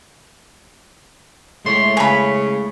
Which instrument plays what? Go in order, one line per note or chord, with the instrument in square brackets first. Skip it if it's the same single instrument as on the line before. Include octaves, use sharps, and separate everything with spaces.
[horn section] A2 C#5 C6 [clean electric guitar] G#3 A3 E4
[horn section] C#3 [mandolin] C#5 B5 [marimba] G#5